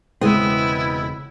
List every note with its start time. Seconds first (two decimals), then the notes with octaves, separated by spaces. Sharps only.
0.21 E1 C#3 G#3 B3 C4 E4